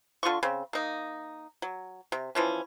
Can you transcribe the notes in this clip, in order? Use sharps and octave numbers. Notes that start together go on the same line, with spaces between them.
D3 F4 C6 C#6
C#3 C4
A#3 D#4
F#3
C3
E3 F3 C#4